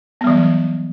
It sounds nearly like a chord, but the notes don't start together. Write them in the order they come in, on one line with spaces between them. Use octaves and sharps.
B3 G3 E3 F#3